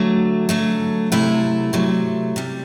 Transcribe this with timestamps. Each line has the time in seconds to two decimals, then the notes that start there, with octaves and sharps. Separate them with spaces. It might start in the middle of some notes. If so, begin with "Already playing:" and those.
Already playing: D3 F#3 A3
0.49 D3 F#3 A3
1.12 C3 F#3 A3 E4
1.73 C3 F#3 A3
2.36 C3 G3